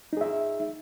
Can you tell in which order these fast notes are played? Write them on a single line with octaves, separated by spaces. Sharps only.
D#4 G#4 E5